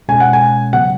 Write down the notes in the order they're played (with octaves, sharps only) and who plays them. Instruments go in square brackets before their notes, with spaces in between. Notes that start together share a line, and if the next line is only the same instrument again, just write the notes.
[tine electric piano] B2 G#3 C#4 [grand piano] G#5
[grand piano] F#5
G#5
[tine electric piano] C#3 F#3 B3 [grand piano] F#5